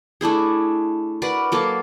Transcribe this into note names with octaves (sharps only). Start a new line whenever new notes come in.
A3 D4 E4 G#4
F#4 A#4 B4 D5
F#3 A#3 A4